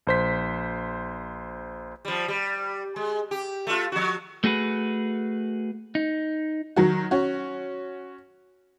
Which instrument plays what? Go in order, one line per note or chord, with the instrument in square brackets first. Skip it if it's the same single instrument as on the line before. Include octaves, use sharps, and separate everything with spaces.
[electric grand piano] A#1 C5 B6
[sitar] F3 G3
G3
G#3
G4
A3 F4
F3 F#4
[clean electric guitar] A3 F#4 G#4 B4
D#4
[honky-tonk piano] D#3 F#3 F#4
C#4 F#4